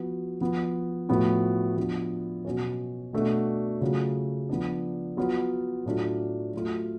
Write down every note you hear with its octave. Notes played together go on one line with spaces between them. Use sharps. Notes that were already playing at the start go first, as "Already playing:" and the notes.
Already playing: F3 B3 F#4
F3 B3 F4
A2 F3 B3 F#4
F3 B3 D4
B2 F#3 C#4
B2 A3 D4 F#4
C#3 F#3 A3 C#4 F4
F3 B3 D4
F#3 B3 F4
A2 F#3 A3 D4 F4
F#3 A3 F4